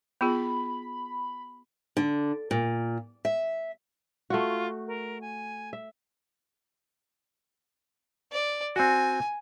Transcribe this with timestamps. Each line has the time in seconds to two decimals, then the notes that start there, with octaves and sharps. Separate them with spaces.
0.21 B3 F4 G#4 B5
1.97 D3
2.51 A#2
3.25 E5
4.30 A3 F4 F#4
4.87 A#4
5.21 G#5
5.73 E5
8.32 D5
8.76 C4 F#4 G#5